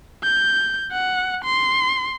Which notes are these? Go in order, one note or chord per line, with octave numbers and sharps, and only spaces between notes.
G6
F#5
C6